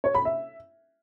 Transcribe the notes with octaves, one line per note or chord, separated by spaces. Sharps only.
C#5
B5
E5